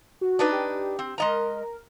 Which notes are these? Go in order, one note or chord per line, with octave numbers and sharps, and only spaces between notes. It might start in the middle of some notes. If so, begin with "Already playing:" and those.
F#4
D4 D#4 B4
G4
C4
G#3 A#4 D#5 A#5